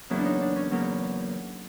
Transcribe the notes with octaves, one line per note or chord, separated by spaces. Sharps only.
E2 C#3 F#3 A#3 E4
D4
D#4
D4
C#4
E2 C#3 F#3 A#3